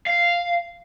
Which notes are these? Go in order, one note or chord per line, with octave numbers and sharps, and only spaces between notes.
F5